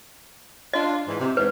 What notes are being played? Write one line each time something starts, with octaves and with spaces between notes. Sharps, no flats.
D4 F4 D#5
G#2 E3
C3
E2 G#2 B4